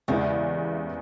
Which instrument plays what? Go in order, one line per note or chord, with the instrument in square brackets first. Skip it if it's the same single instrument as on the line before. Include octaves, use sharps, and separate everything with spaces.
[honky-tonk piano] E2 C#3 E3 G#3 [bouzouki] G3 A#3